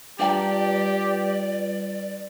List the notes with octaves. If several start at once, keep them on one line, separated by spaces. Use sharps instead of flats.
G3 D4 F4 G4 B4 D5 G5 A#5